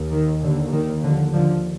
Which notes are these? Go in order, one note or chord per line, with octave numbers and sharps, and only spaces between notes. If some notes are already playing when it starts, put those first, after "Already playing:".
Already playing: D#2
D#3
D3
D#3
D3 F3
D3 F3